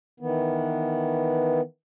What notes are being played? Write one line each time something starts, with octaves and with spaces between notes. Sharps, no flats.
D#3 E3 B3